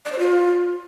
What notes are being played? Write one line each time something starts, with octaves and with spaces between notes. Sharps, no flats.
D5
C5
F4